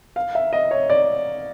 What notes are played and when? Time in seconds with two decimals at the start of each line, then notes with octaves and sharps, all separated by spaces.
0.16 F5
0.35 E5
0.53 D#5
0.71 C#5
0.90 D5